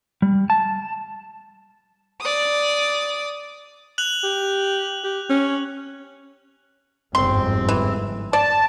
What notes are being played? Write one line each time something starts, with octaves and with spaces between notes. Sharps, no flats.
G3
A5
D5 D#6
F#6 F7 F#7
G4
G4
C#4
G1 F2 G#2 C4 C6
E3
D5 A5